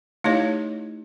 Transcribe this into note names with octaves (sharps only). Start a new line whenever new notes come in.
A3 D#4 E4 G4 C#5 D#5